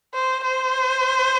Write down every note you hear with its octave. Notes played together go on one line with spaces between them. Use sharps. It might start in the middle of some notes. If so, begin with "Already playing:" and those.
C5
C5